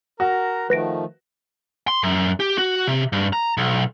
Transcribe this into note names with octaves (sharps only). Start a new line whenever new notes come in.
F#4 A#4 A#5
D#3 F3 A3 B4 A#6 D7
C6
F#2
G4
F#4
C3
G2
A#5
B1